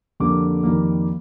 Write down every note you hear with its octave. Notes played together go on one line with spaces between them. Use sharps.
F2 D3 G3 A#3 D6
F2 D#3 G3 A#3